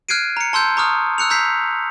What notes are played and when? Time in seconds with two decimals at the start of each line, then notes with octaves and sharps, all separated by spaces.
0.09 F6 F#6 G#6 C7 D7 D#7
0.37 A#5 C#7
0.53 A5 C6 E6 G6
0.77 A#5 C#6 D#6 F6
1.18 E6 F#6 C#7 F7
1.30 A#5 E6 G6 B6 C7